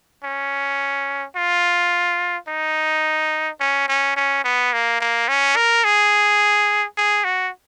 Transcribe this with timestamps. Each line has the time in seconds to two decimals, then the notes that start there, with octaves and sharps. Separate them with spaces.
0.24 C#4
1.36 F4
2.48 D#4
3.60 C#4
3.88 C#4
4.16 C#4
4.44 B3
4.73 A#3
5.00 A#3
5.28 C#4
5.56 A#4
5.84 G#4
6.97 G#4
7.24 F#4